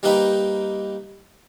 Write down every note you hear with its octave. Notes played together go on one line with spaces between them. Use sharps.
G3 A#3 D#4 B4 G5